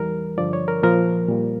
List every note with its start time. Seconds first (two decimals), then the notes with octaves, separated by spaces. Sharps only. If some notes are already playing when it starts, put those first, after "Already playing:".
Already playing: E2 E3 G3 A#4
0.38 G2 D3 F3 D5
0.53 C#5
0.68 A#4
0.83 A#2 F3 A#4
1.29 A#2 G3